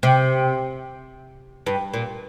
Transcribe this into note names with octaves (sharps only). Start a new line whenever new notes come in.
C3
G2
A#2